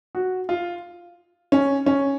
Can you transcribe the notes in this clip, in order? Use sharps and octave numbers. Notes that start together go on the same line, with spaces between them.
F#4
F4
C#4
C#4